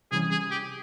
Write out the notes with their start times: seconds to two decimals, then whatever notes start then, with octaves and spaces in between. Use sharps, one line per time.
0.12 C3 E3 G3 C#4 G#4
0.31 G#4
0.51 G4